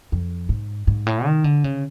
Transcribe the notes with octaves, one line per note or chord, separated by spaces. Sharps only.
F2
G#2
G#2
A2
D#3
D3
C#3